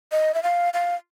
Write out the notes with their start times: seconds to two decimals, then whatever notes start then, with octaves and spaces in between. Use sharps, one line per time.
0.12 D#5
0.34 E5
0.43 F5
0.74 F5